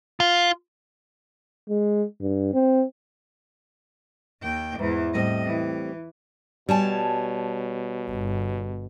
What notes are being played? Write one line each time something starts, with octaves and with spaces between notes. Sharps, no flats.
F4
G#3
G2
C4
D#2 G5
E2 G#2 E3
A2 G3 C4 D#5
E3
B2 G3 C#5 G#5 A5
G1